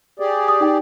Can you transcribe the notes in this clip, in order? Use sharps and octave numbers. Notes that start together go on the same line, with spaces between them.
G4 G#4 D5
D#6
D#4 G5